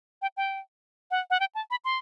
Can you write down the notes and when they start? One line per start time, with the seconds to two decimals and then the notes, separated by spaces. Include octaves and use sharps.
0.22 G5
0.37 G5
1.11 F#5
1.30 F#5
1.40 G5
1.55 A5
1.71 B5
1.85 C6